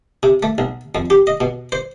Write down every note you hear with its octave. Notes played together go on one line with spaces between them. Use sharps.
C3
A3
B1
F2
G4
D#5
B2
C5